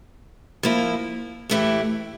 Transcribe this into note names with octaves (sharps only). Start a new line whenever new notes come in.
F3 A#3 E4
A2 E3 A3 E4 G4